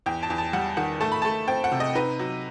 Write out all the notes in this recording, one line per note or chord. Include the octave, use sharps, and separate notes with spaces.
E2 G5
A5
E2
A5
G3 F#5
D#3 F#5
A3 A5
B5
A3 A5
C4 G5
F#5
C3
D#5
D#4 B4
F#3